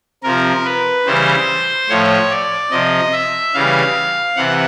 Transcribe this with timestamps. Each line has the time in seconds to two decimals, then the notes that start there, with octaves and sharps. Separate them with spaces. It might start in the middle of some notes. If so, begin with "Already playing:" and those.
0.23 C3 F3 A#4
0.65 B4
1.06 C#3 E3 G3 C5
1.89 A2 F3 C#5
2.31 D5
2.71 C3 F3 D#5
3.13 E5
3.54 C#3 E3 G3 F5
4.36 C3 E3 F#5